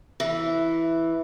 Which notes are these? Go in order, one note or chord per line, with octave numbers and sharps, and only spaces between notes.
E3